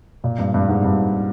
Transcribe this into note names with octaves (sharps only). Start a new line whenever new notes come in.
A#2
G2
G2
G#2
G2